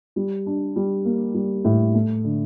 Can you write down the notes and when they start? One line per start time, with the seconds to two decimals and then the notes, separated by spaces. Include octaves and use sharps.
0.16 G3
0.46 D4
0.76 G3
1.05 A#3
1.34 G3
1.65 A2
1.94 A3
2.24 D3